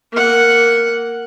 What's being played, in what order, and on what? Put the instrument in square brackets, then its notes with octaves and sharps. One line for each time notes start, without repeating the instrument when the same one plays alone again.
[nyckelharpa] A#3 F#5